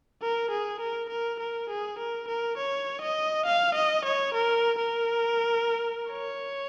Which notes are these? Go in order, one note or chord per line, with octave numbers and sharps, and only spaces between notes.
A#4
G#4
A#4
A#4
A#4
G#4
A#4
A#4
C#5
D#5
F5
D#5
C#5
A#4
A#4
C#5